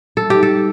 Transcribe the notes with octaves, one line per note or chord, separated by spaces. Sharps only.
G3 A4
D#4 G4
A4
G3